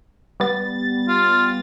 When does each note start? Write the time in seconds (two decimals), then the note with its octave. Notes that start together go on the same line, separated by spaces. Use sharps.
0.40 G3 B3 A6
1.08 F4